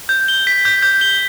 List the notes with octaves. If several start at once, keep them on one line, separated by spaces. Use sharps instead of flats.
G6
G7
B6
G6
G6
G7